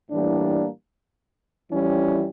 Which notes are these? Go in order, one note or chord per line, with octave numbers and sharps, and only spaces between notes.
A2 E3 G3 A#3 D4
F2 E3 G3 C#4 E4